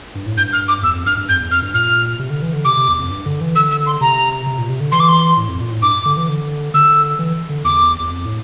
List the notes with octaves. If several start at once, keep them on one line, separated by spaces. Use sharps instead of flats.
G2
A2
G2 G6
F6
D6
E2 E6
F2
G2 F6
G2
F2 G6
E2
F2 F6
G2
A#2 F6
C3
D3
E3
D3
C3 D6
C3
E2
F2
G2
D3
E3
D3 E6
E6
C6
C3 A#5
C3
A#2
C3
D3
E3 C6
D6
C6
A2
F2
A#2
A2
G2 D6
D3
E3
D3
D3 E6
E3
D3
E2 D6
E2
F2
A2